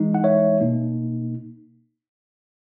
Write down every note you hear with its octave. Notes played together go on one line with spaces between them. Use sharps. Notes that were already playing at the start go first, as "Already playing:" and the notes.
Already playing: E3 G#3 D#4
F#5
C#5 E5
B2 A#3 D#4